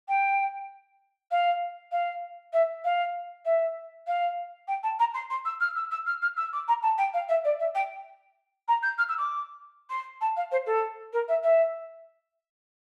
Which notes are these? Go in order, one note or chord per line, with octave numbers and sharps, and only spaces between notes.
G5
F5
F5
E5
F5
E5
F5
G5
A5
A#5
C6
C6
E6
F6
E6
E6
F6
F6
E6
D6
A#5
A5
G5
F5
E5
D5
E5
G5
A#5
G6
F6
E6
D6
C6
A5
F5
C5
A4
A#4
E5
E5